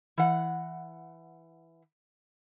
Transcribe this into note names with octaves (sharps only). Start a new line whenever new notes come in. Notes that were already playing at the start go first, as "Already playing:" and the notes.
E3 F#5